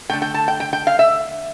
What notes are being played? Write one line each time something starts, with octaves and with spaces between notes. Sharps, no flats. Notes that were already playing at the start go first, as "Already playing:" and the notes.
D3 A3 G5
G5
A5
G5
G5
G5
F5
E5